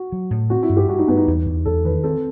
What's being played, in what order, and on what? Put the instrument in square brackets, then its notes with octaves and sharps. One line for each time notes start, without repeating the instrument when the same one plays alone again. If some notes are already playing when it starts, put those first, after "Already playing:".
Already playing: [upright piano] F#4
[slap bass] F#3
A2
[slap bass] C4 [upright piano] F#4
[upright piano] E4
[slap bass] G2
[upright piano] G4
[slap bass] G2 [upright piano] F#4
[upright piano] D#4
[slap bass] G2 [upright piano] B3
[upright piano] D#4
[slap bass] E2
E2
[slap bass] E2 [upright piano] A4
[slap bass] D#3 [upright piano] B4
[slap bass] C4 [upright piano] A4